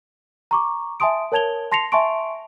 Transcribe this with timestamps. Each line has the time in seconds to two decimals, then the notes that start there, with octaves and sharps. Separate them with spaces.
0.51 A#5 C#6 D6
1.00 E5 G#5 A5 C6 D#6 D7
1.32 A#4 C#5 A5 G#6 F7 G7
1.71 A5 C6 A#6 C7 C#7 F7
1.92 E5 G#5 A5 C6 C#6 D7